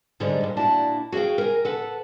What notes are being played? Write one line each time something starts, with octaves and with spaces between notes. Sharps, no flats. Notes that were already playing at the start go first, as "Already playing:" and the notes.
G#2 D3 G3 G#3 D5
G2 A#2
A#2 D4 E4 F#4 A5
F#4 G#4 D5 F5 G5
A#4 G#5
A4 B4 F#5 A5